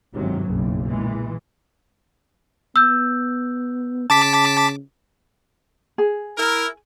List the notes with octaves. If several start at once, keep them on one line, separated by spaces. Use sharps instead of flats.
G1 G#2 C3 D#3 F#3
F#1 B1 G2 C#3
A#2 E3 G#3
B3 E6 G6
C#3 A5 D6 B6
G#4
E4 A#4